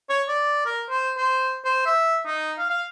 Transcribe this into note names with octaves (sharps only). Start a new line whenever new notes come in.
C#5
D5
A#4
C5
C5
C5
E5
D#4
F5
F5